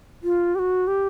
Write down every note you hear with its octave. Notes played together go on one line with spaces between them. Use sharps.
F4
G4
F#4
G4